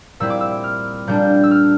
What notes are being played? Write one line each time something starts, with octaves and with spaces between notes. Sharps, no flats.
A#2 G3 C4 E4 E6
D6
E6
F6
A#2 G3 D4 G6
E6
F6